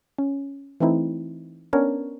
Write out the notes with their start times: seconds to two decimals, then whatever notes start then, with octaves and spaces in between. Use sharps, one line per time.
0.18 C#4
0.80 E3 A3 C4 D#4 E4
1.73 B3 C#4 D4 A#4 C#5